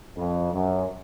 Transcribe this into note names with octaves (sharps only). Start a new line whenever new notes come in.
F2
F#2